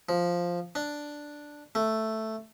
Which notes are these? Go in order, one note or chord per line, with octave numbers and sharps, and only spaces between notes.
F3
D4
A3